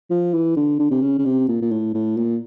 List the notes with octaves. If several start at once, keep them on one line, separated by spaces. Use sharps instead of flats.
F3
E3
D3
D3
C3
C#3
C#3
C3
A#2
A#2
A2
A2
A#2